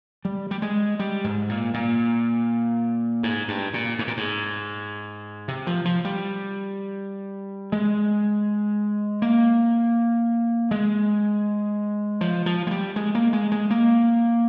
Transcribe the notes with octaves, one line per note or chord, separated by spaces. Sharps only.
G3
G3
G#3
G3
G#2
A#2
A#2
G#2
G2
A#2
G#2
A#2
G#2
C3
F3
F3
G3
G#3
A#3
G#3
F3
F3
G#3
G3
G#3
A#3
G#3
G#3
A#3